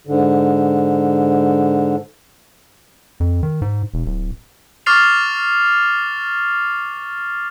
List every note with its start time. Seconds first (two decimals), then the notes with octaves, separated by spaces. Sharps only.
0.07 G#2 D3
3.20 F2
3.43 D#3
3.62 G#2
3.94 E1
4.06 D1
4.86 C#6 D6 F6 A6 C7 F7